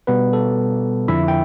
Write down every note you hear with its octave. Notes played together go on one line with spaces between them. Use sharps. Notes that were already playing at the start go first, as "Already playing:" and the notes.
B2 G3 B3 B4
A4
F2 D3 F3 E4 E5
G5